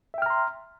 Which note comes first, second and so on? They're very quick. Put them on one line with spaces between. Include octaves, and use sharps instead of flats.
E5 G5 F6 A#5 C6